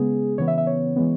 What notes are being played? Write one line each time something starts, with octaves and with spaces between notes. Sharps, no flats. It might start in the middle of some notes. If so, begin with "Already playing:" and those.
Already playing: C#3 G#3 B3 G#4
C#3 E3 B3 C#5
E5
E5
C#5
E3 G#3 B3